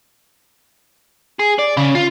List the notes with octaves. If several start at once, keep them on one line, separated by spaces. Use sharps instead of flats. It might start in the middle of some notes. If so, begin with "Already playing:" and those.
G#4
D5
C#3
F4